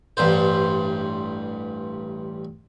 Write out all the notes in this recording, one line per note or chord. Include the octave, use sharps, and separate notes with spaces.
A1 G2 C5